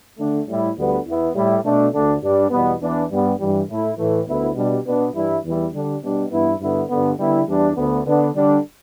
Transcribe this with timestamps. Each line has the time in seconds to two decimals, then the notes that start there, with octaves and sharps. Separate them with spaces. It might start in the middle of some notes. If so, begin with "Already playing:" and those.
0.17 D3 A3 D4
0.47 A2 G3 E4
0.76 D2 D3 G3 B3
1.06 E2 E3 B3 E4
1.34 A2 G3 E4
1.64 B2 A3 D4
1.92 D2 D3 A3 D4
2.22 G2 G3 D4
2.51 E2 B2 G3 B3
2.80 E2 E3 B3 D4
3.10 G2 G3 B3
3.38 G2 E3 G3
3.69 A2 A3 E4
3.98 A2 E3 A3
4.27 D2 D3 B3 E4
4.55 B2 G3 D4
4.85 B2 B3 D4
5.14 G2 E3 G3 E4
5.43 E2 E3 G3 E4
5.72 D3 G3 D4
6.02 B2 G3 D4
6.31 G2 E3 B3 E4
6.59 G2 D3 B3 E4
6.89 G2 D3 B3
7.18 D3 G3 B3 E4
7.48 E2 E3 G3 D4
7.76 D2 D3 B3
8.06 D3 B3 D4
8.35 D3 G3 D4